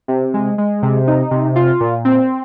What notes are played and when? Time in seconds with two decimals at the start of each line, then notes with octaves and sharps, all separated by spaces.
0.08 C3
0.34 G#3
0.58 G#3
0.83 C3
1.07 D#4
1.31 C3
1.56 F4
1.80 A#2
2.05 C4